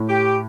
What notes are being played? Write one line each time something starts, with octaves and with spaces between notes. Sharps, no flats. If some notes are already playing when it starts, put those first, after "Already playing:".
Already playing: A2
G4